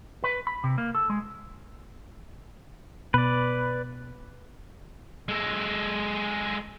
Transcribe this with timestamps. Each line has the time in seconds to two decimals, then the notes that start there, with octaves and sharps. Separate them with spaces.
0.24 B4
0.47 B5
0.64 C3
0.78 A#3
0.95 A4
1.10 G#3
3.14 B2 B4 D5
5.29 G#3 A4